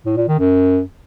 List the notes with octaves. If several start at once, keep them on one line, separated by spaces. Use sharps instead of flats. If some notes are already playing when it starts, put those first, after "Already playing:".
A2
A#2
D#3
F#2